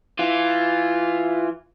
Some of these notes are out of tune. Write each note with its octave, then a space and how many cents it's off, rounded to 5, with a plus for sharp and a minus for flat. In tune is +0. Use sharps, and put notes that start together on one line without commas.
E3 +10 F4 +0